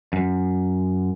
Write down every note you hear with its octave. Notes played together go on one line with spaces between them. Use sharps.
F#2